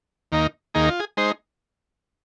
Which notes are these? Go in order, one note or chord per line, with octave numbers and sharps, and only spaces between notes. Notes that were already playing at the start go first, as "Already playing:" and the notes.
D#2 D#3 A#3 D#4
D#2 D#3 A#3 D#4 G#4
F4
G#4
G#3 D#4 C5